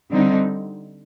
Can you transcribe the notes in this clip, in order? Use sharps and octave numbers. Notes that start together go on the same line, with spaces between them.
D3 G3 C4 D#4